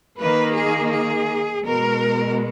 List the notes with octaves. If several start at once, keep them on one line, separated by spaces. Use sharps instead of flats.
D#3 A#3 B4
G#4
G#4
B2 G#3 A#4